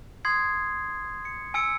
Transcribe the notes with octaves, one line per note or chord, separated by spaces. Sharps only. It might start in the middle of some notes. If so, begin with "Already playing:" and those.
C6 D#6 G#6 C7
C#7
G#5 E6 C#7 D7